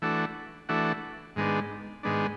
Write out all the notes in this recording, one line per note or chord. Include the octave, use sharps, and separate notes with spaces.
E3 A3 D4 F#4
E3 A3 D4 F#4
G#2 D#3 G#3 B3 D4
G#2 D#3 G#3 B3 D4